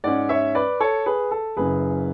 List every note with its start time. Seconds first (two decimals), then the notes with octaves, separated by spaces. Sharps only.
0.04 G#2 G#3 C#4 D5 F#5
0.29 C#5 E5
0.55 B4 D5
0.80 A4 C#5
1.06 G#4 B4
1.31 A4
1.57 F#1 F#2 C#3 G#4 B4